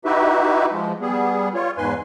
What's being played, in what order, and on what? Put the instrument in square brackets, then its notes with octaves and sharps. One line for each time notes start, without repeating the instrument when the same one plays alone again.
[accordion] D#4 E4 F#4 G4 B4 E5
F3 G#3
G3 B3 G#4
F4 C#5
E2 G#2 B4 G#5 C6